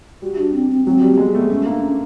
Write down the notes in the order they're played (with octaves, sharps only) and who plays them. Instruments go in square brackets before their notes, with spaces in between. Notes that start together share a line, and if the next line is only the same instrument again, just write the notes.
[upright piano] G3 [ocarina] F#4
[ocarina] D4
C4
C4
[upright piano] F#3 [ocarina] C4
[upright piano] G3
[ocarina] A#3
[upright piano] G#3 [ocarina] B3
[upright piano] A3 [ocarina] B3
[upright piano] A3 [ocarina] C#4
[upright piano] A#3 [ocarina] D4
[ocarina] C#4